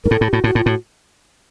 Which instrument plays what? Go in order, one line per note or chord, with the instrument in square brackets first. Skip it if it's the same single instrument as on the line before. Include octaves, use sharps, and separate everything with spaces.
[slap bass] G#2 [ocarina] A#4
[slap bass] A2 [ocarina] A4
[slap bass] A2
[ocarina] G4
[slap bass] A2 [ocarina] F#4
[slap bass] A2 [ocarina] F#4
[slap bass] A2 [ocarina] F4
[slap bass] A2 [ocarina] F#4